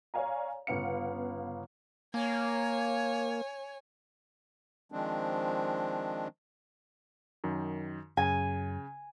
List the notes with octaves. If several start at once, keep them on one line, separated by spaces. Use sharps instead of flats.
C#5 D5 F5 G#5 A#5
G1 C#3 B3 F5 F#5 C#7
A#3 C#5 G#5
D#3 F3 G#3 C4 D4
F#2 D#3
F#2 C#3 G#5